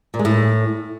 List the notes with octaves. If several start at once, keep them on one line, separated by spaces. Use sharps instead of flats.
A#2
G#3
A2